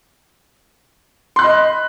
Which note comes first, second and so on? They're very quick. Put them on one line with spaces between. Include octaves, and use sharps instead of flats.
C6 F#6 B5 D#5